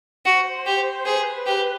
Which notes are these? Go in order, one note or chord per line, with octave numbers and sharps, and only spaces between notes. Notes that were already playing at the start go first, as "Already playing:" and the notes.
F#4 C5
G4
G#4 B4
G4